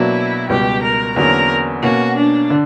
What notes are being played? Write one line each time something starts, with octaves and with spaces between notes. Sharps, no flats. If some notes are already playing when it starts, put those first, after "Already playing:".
Already playing: B2 F#3 A#3 D4 E4
C#2 B2 G3 G4
A#4
E2 D3 F#3 A#3 C#4 A#4
B2 A#3 C#4 F#4
D4
D3